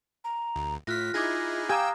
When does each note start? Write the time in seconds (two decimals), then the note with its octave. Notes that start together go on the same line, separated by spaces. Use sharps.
0.24 A#5
0.56 D2
0.87 A2 F4 F6 F#6 A#6 B6
1.14 D#4 E4 G#4 D6 G#6 A#6
1.69 G4 F5 G5 G#5 A#5 D#6 E6